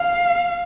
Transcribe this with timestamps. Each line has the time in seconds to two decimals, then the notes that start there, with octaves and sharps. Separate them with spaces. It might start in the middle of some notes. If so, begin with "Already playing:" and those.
Already playing: F5